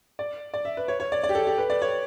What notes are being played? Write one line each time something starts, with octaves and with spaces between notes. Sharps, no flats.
D5
D5
E5
B4
C#5
C#5
D5
D5
G4
A4
G4
B4
D5
C#5